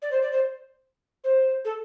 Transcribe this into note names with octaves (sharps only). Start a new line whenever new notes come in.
D5
C5
D5
C5
C5
A4